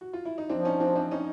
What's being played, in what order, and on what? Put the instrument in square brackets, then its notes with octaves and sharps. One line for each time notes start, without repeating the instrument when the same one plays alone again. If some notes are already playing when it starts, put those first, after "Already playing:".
[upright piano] F#4
F4
E4
D#4
[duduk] F3 [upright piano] C4 D4
[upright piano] C#4 D#4
C4 D4
C4 D4
C#4 D#4